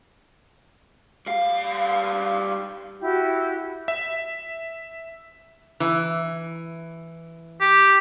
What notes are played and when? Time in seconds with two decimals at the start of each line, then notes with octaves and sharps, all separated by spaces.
1.26 G3 F5
3.00 E4 F#4 G4
3.88 E5
5.80 E3
7.61 G4